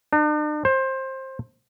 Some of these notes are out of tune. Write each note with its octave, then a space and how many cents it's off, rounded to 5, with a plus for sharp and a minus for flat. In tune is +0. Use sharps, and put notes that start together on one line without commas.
D4 +45
C5 +20